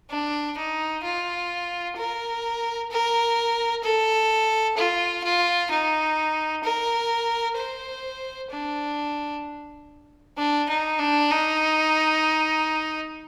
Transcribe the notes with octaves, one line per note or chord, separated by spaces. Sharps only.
D4
D#4
F4
A#4
A#4
A4
F4
F4
D#4
A#4
C5
D4
D4
D#4
D4
D#4